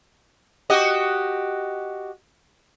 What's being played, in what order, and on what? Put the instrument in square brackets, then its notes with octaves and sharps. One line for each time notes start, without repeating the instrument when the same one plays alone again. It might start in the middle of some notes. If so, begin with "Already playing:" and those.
[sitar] F#4 G4 D#5